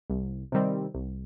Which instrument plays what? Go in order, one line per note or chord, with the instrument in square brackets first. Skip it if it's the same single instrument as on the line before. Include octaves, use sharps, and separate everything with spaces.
[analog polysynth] C2
C3 D#3 G3 C4
C2